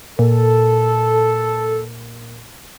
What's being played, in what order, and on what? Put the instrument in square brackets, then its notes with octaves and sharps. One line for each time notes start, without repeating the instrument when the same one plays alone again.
[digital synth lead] A#2 [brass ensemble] A4